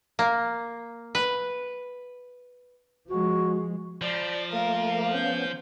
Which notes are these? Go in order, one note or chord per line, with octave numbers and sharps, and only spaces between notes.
A#3
B4
F3 G#3 F#4
F3 D5 G5 A#5 B5
A3 A#3 A#4 F5 D6
B3 C#4 G6